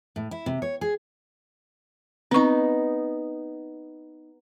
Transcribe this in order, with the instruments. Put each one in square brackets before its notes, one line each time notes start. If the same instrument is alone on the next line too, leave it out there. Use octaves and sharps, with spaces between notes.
[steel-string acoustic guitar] A2
E4
C3
C#5
G#4
[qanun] B3 D#4 [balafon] C4 C#6